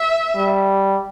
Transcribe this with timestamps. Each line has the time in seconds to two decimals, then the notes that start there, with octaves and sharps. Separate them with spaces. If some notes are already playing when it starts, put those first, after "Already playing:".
Already playing: E5
0.35 G3